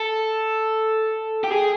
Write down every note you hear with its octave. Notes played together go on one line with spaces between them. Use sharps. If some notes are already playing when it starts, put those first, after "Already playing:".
Already playing: A4
G4
G#4